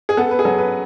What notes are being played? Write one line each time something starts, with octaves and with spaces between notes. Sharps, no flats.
G#4
B3 A4
B4
G#4
F#3 A4
B4